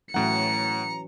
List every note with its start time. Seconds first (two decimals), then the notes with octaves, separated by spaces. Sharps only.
0.14 A2 E3 F#3 C#4 F#5 A#5 C#7